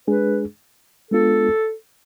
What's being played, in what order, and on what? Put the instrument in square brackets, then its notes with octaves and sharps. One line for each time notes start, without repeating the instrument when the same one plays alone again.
[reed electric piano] G#3 D4 G#4 [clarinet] B4
[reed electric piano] G#3 B3 D4 F4 [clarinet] A4